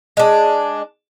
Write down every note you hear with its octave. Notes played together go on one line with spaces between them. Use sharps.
G#3 D4